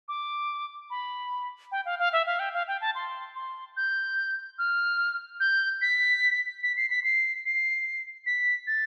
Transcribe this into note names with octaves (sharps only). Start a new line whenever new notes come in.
D6
B5
G5
F5
F5
E5
F5
G5
F5
G5
A5
C6
C6
G6
F6
G6
B6
B6
C7
B6
C7
C7
B6
A6